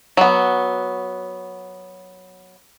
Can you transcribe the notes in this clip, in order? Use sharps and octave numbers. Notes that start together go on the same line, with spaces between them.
F#3 B3